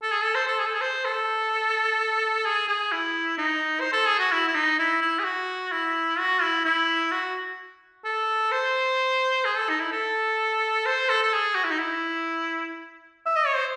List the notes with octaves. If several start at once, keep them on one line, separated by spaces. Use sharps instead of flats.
A4
G#4
A4
C5
A4
G#4
A4
G#4
C5
A4
G#4
G#4
E4
D#4
C5
A4
G#4
F#4
E4
E4
D#4
E4
E4
G#4
F#4
E4
F#4
E4
E4
F#4
A4
C5
G#4
A4
D#4
E4
A4
C5
A4
A4
G#4
F#4
E4
D#4
E4
E5
D#5
C#5
C5